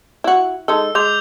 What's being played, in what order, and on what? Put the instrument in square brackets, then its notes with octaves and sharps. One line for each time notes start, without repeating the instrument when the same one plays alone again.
[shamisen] E4 F#4
[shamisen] G#3 D#4 A4 [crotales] E6
[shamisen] G#3 [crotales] D6 G6 F7